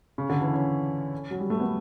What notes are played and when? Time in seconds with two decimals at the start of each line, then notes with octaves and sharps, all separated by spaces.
0.18 C#3
0.29 D3
0.41 E3
0.53 C#4
1.31 F#3
1.40 G3
1.50 A3
1.60 B3